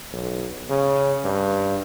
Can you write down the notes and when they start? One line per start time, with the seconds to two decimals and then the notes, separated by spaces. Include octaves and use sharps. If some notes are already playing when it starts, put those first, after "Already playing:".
0.13 B1
0.70 C#3
1.24 G2